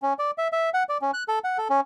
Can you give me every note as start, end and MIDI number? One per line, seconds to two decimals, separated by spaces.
0.02 0.13 61
0.19 0.31 74
0.38 0.48 76
0.52 0.70 76
0.74 0.83 78
0.89 0.98 74
1.02 1.11 61
1.14 1.23 90
1.28 1.39 69
1.44 1.58 78
1.58 1.68 69
1.70 1.80 61